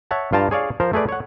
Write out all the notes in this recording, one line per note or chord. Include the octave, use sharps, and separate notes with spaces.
C#5 E5 F#5 A5
G2 F4 G5 A5 A#5
G#4 C#5 D5 F5
F3 A#4 C5
A3 G#4 B4 D5
C#5 F#5